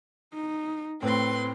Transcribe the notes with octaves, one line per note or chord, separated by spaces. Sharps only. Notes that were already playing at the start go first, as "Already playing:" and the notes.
D#4
A2 C4 B4 C6